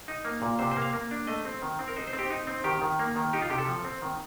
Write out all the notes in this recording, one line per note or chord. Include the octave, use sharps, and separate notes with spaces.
D#4
A#3
A#2
C3 C5
C5
A#3 F5
A#3
D4
A3 D#5
C4
D#3
C4
A#4
D#4 C5
C5
C4
G4
D#4
C4
D#3 G4
D#3
A#3
D#3
D#4 G4
F4
C3 G4
A4
F3
C4
D#3